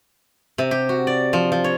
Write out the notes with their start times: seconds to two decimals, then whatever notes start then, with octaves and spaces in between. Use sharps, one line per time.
0.58 C3
0.71 G4
0.89 F#4
1.07 D5
1.33 F3
1.52 F3
1.64 C#5